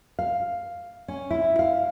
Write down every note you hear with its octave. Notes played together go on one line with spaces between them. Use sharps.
F5
C#4
E4
F5